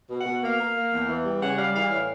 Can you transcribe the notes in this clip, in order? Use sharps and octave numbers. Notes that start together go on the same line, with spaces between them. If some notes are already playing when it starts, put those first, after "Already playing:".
B2
F#5
B2
A#3 F5
A#3
A#3
E2
E3
G3
C#3 F#5
G3 F5
E3 F5
A2 F5